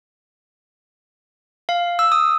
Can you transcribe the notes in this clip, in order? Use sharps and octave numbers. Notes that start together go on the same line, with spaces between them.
F5
E6
D#6